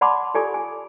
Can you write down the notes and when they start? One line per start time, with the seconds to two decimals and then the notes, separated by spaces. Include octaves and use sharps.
0.01 D5 F#5 A5 B5 C6 D6
0.34 F4 G4 A4 D5 G#5 D6
0.54 G#5